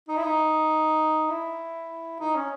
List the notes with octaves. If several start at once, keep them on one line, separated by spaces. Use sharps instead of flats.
D#4
E4
D#4
E4
D#4
C#4